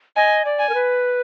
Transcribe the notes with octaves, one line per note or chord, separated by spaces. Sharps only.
D#5 G#5
D5
G#5
A#4
B4